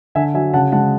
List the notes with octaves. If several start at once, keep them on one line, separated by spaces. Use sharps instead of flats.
D3 E5 G#5
F#3 E5 G#5
C#3 F#5 A5
G#3 F#5 A5